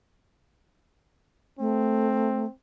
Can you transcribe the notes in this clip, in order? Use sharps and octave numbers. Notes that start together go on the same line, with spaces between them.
A3 C4